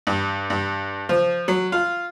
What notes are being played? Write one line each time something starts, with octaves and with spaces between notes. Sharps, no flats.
G2
G2
F3
F#3
F4